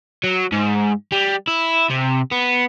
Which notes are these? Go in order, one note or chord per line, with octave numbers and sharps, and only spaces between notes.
F#3
G#2
G3
E4
C3
B3